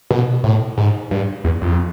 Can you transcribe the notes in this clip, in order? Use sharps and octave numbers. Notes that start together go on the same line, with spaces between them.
B2
A2
G#2
G2
E2
F2